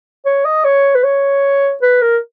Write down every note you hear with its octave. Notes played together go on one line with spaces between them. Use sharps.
C#5
D#5
C#5
B4
C#5
B4
A#4